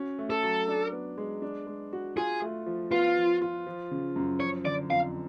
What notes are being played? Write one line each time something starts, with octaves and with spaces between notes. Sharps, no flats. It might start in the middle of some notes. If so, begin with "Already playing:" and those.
Already playing: C#4 F#4
A3
A4
F#3
D4
B3
G#3
D4
G#3
F#4
F4 G#4
A3
F3
B3 F4
F3
F4
F3
C#3
F#2
F3 C#5
D3 D5
F2 F5